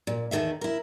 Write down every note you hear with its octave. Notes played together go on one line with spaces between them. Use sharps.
A#2
E2 B2 D#3 A4 E5
E4 A#4